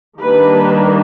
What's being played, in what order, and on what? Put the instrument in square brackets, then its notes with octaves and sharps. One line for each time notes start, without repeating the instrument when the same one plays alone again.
[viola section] D#3 G3 A#3 D4 B4